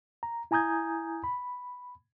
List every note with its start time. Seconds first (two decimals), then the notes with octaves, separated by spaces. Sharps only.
0.23 A#5
0.51 E4 G#5 A#5 D#6 G6 G#6
1.24 B5